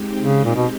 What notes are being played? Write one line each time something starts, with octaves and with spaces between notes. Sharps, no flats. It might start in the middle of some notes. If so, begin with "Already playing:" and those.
Already playing: G#3 C4 D#4 G4
C#3
A#2
B2